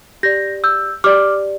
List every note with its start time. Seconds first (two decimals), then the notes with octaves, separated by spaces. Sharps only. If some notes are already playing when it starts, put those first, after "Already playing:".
0.23 G4 D5 G6 A#6
0.64 E6 G6
1.04 G4 D5 D6 F6